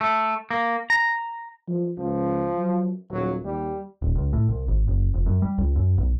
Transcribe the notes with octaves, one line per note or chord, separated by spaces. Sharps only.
A3
A#3
A#5
F3
C#2 F3
F#3
D#1 F#3
D#2 G3
D#1
C#2
A2
C2
G#1
F#1
F1
F#2
G3
C#2
F#2
B1